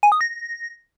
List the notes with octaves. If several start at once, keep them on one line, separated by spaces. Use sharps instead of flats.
G#5
D#6
A#6